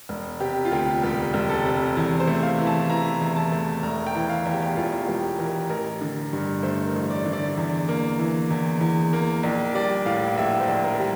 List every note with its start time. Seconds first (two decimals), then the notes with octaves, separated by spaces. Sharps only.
0.09 E1
0.40 C3 G4
0.65 F4
0.72 D2 G4
1.03 E1 G4
1.34 E1
1.49 A4
1.65 C3
1.97 E2
2.20 C5
2.27 A3
2.43 F5
2.58 E3
2.67 A5
2.89 E4 A#5
3.21 E2
3.36 A5
3.52 A3
3.83 E1 A#5
4.07 G5
4.15 E3
4.29 F5
4.45 E2
4.53 G4
4.76 E1 F4
5.07 E1 G4
5.39 E3 A#4
5.69 A1 A#4
6.01 D3
6.33 G2
6.63 A3 C5
6.86 A#4
6.95 A1
7.10 D5
7.26 D3
7.33 D5
7.57 E2
7.89 A#3
8.19 E3
8.50 E2
8.81 E2
9.13 A#3
9.43 A#1
9.74 G3 D5
10.06 A2 F5
10.37 A#1 E5
10.60 C5
10.68 A#1
10.84 A#4
11.00 G3